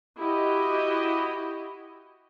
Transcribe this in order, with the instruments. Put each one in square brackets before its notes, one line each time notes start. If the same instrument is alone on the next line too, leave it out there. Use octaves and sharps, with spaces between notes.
[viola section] E4 F#4 G4 D#5